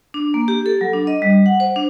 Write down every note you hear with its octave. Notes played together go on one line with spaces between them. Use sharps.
D4
A#3
G4
A4
F#3
D4
D#5
G3
F#5
C5
D4